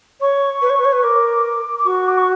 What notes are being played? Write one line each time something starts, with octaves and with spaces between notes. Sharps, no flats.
C#5 C#6
B4
C#5
B4
C#5
B4
A#4 D6
D6
F#4 C#6
D6
C#6